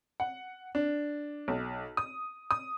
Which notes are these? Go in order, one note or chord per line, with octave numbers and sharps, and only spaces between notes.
F#5
D4
B1
D#6
D#6